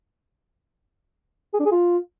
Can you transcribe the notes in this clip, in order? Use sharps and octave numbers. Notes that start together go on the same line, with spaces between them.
G#4
D4
G#4
F4